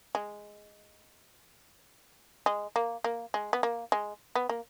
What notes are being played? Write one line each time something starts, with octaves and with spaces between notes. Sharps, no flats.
G#3
G#3
A#3
A#3
G#3
B3
A#3
G#3
B3
A#3